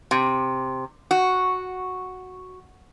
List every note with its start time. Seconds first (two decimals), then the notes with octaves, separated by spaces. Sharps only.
0.11 C3
1.11 F#4